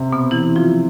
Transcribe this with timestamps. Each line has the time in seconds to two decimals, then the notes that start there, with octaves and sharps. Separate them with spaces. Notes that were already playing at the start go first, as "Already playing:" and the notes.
Already playing: C3
0.13 B2 B3
0.31 E3 E4
0.56 F3 F4